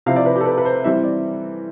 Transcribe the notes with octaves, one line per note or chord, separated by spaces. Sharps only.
C3 F3 C4 E4 F5
D5
B4
G4
A4
B4
B4
C5
E3 G3 C4 E5
D5